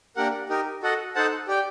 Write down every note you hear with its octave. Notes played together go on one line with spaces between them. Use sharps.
A#3 D4 G4 A#4 F#5
D#4 G4 A#4
F#4 A4 D#5 F#5
D#4 A4 C5 F#5 A5
G4 D5 G5